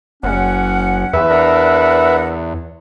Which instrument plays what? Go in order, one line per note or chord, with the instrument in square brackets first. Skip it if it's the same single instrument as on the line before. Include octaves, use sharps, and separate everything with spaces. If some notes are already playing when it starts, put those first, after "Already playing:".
[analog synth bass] F#1 [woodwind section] C#4 F#5
[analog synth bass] E2 [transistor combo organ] B4 E5
[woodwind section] D4 A#4 F#5